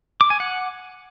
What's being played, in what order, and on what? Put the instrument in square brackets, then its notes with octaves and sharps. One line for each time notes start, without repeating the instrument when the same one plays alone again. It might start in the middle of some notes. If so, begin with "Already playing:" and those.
[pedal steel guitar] D6
G#5
F#5